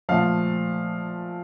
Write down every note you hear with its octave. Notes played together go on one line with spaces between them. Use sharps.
A#2 F3 A3 F5